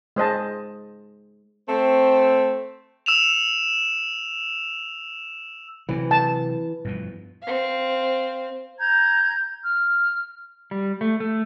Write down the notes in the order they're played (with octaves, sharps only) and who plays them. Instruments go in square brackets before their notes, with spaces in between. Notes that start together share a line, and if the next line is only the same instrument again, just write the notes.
[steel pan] G#3 C5 D#5 A5
[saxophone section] A3 C4
[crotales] E6 E7 F7
[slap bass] C3 F#3 [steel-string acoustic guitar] E3
[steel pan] A5
[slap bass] G2 B2 F3
[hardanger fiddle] C4 F5
[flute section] A#5 G6 G#6
F6
[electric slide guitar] G3
A3
A3